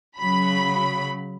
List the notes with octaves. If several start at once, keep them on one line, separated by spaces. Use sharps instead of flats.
C#3 F#3 B5